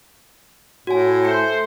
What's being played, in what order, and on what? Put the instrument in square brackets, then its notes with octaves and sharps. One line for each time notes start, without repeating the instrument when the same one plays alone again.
[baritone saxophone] A2 [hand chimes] F#4 C#5 G#5
[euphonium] A3 [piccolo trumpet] C5 [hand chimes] C#7